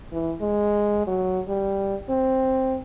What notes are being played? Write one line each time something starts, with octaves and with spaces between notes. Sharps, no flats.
E3
G#3
F#3
G3
C4